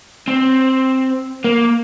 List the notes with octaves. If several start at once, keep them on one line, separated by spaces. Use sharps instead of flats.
C4
A#3